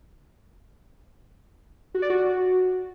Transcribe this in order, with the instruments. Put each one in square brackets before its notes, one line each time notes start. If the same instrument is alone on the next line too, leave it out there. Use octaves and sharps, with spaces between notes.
[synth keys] F#4
D5
F#4